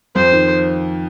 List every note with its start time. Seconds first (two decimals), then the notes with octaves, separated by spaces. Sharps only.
0.15 F2 F3 C5
0.32 D#3